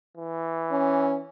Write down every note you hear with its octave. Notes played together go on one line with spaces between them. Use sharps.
E3
C#4